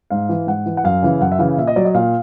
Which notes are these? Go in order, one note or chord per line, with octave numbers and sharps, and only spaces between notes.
G#2 F5
E3
G#2 F#5
E3
F#5
F#2 F5
C#3 E3
F#2 F#5
E5
C#3 E3 F5
A#2 E5
D#5
F#3 D5
D#5
A#2 F5